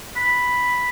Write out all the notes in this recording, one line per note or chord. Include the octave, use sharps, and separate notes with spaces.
B5